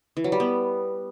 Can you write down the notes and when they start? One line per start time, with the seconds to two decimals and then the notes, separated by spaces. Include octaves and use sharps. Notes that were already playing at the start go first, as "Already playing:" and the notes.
0.17 E3
0.24 F#3
0.32 G3
0.40 B3